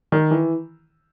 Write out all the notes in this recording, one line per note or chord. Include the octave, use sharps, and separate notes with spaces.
D#3
E3